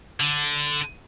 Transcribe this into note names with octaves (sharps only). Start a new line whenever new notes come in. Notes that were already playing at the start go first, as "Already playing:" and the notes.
D3